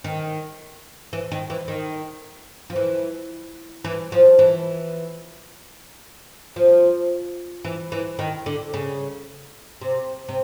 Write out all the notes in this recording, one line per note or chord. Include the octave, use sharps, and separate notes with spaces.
D#3
E3
D#3
E3
D#3
F3
E3
E3
F3
E3
F3
E3
E3
D#3
D3
C#3
C3
C3